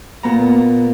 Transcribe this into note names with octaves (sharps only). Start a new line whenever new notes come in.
A#2 B3 A#5